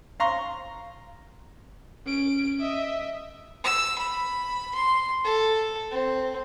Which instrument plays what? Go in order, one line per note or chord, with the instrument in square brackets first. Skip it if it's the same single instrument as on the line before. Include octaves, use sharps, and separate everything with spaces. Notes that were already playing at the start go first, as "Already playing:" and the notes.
[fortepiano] F5 A#5 C6 C#6
[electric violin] C#4 D7
D#5 E5
[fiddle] E6
B5
C6
A4
C4